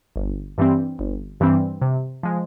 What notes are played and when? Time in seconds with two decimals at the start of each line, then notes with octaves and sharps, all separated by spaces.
0.16 G1
0.58 G2 E3 G3 C4
0.99 G1
1.40 G2 E3 G3 C4
1.81 C3
2.23 F3 G#3